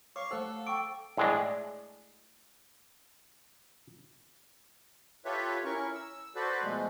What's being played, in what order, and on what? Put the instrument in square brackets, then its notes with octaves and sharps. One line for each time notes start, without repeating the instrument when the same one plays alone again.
[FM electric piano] C#5 [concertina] F5 C#6 [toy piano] D6
[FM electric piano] A3 F5 F#5 [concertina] A4 [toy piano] C5
[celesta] G5 C#6 D7 [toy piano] D6
[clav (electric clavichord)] A2 G#3 D4
[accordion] F4 G4 A4 B4 C#5 E5
C#4 E4 A#4 C#6
E6
F#4 A4 B4 C5 D5
B2 F3 G#3 A3